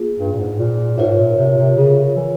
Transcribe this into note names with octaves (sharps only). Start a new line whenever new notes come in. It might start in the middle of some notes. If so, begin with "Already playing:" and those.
Already playing: A#3 F4 G#4
G2
A#2
G#2
A#2
G#2 F4 A#4 C#5 E5
A#2
C3
C3
C#3
E3